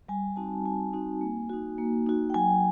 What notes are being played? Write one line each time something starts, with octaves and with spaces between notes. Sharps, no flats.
G3 G#5
C4 D#4 F#4 A5
G3 G#5
C4 D#4 F#4
A#3
D#4 F#4
A#3
D#4 F#4
G5
F#3 G#5